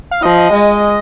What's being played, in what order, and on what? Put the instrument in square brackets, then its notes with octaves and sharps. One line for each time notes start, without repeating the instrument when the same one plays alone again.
[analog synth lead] F5
[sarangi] F3 [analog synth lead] D#5
[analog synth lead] D#5
[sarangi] G#3